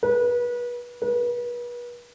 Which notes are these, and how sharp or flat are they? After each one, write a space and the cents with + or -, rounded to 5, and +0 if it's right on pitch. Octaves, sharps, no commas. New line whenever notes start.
B4 -30
B4 -35